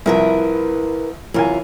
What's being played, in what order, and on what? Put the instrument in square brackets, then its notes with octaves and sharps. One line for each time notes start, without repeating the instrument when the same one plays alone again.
[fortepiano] C2 F3 [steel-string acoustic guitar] E4 A#4 B4
[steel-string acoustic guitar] F#2 C3 F4 [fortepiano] E3 A#4 G#5